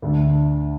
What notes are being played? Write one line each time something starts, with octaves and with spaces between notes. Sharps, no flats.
D2 D3 A3